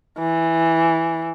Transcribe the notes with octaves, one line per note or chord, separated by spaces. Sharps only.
E3